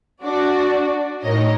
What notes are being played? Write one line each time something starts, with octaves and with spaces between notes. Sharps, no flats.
D4 F#4 D5
A2 D#4 A#4 C#5 D#5